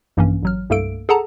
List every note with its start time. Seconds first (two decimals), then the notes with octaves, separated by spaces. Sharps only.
0.17 A#1 G2 E3 A#3 C#4
0.43 A1 F#3 F6
0.70 C2 G2 A3 A#3 A4 D7
1.09 G#4 A4 F#5 A5 A#5